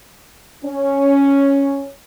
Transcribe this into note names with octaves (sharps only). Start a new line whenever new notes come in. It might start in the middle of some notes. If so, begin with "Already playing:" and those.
C#4